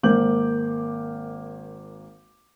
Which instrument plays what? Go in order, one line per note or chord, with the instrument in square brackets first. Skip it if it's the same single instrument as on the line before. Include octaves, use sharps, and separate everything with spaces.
[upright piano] G#1 A#3 C5 D6 G6 F#7